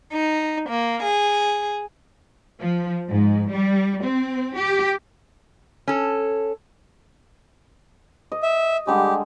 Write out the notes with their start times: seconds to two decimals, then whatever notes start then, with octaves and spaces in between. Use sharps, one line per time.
0.13 D#4
0.70 A#3
1.04 G#4
2.60 F3
3.08 G#2
3.51 G3
4.04 C4
4.57 G4
5.88 C#4 A4
8.32 D#5
8.43 E5
8.87 D3 G3 G#3 G4